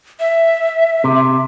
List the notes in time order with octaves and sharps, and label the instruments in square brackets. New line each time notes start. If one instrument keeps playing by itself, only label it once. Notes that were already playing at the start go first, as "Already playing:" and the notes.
[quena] E5
[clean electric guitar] C3